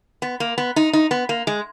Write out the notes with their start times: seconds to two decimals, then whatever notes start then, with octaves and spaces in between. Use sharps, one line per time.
0.22 B3
0.40 A#3
0.58 B3
0.76 D#4
0.93 D#4
1.11 B3
1.29 A#3
1.47 G#3